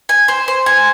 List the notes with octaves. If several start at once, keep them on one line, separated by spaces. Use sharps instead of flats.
G#5
C5
C5
G#5